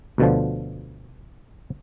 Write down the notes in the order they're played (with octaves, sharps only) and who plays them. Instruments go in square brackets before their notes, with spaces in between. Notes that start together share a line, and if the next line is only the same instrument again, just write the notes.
[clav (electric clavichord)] D2 B2 D3 F3